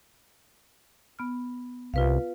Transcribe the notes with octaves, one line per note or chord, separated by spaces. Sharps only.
B3 F6
C2 F4 B4 F5